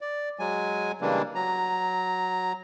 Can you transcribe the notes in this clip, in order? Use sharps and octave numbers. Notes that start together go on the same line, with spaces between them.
D5
F#3 G#3 G#5
C#3 E3 G3 G#3 A#3 D4
F#3 A#5